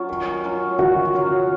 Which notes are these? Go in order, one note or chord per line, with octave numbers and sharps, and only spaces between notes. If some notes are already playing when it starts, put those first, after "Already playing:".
Already playing: F#3 C#4 F4
D#3
F#3 C#4 F4
D#3 F#4
F#3 C#4 F4